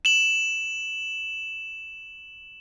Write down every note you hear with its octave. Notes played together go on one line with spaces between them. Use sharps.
E7 F#7